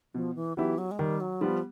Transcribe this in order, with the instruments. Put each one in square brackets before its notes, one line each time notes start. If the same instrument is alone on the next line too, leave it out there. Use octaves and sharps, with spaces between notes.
[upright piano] B2 [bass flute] F3
[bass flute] E3
[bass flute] E3 [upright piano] F#3 B3 E4 G4
[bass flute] F#3
G#3
[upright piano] D#3 [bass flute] G3
[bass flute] F#3
[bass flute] F3 [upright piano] G3 B3